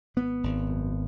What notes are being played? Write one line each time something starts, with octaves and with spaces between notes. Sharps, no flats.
G#1 B3
G#1
F#2